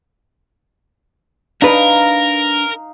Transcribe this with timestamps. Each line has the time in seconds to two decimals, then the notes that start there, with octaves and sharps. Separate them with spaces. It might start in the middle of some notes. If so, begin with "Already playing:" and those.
1.62 D4 D#4 A#4 B4 F5 A#5